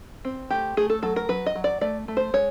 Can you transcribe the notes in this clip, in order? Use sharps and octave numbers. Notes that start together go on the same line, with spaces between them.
C4
A3 G4
A3 G#4
A4
F#3 A4
A#4
F#3 B4
D#5
F#3
D5
A3 D5
A3
C5
G#3 C#5